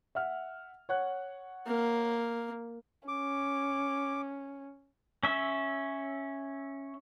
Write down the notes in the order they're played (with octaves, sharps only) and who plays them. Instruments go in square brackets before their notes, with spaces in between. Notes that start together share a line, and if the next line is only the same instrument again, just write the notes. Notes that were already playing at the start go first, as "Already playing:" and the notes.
[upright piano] E5 F#5 F6
C#5 F#5 F#6
[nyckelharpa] A#3
[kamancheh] C#4 [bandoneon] D6
[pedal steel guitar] C#4 E5